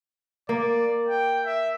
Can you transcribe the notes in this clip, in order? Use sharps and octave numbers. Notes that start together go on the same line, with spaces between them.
A#3 D5
G5
E5